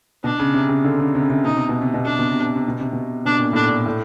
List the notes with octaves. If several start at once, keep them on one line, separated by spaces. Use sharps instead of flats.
B2 D4
C#3
C3
C#3
D3
C#3
C3
C#3
C3
B2 D#4
C3
B2
C3
B2
C3 D4
B2
C3
B2
C3
B2
C3
B2
B2 D4
A#2
A2 D4
A#2
A2